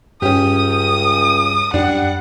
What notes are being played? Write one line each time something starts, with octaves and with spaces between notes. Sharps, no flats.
C#2 G2 C#4 G4 D#6
F#2 G3 D4 F#5